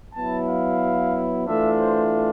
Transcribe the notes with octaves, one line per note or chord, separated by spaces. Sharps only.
F#3 B3 E4 A5
F5
E3 A3 D4 F4 E5
C5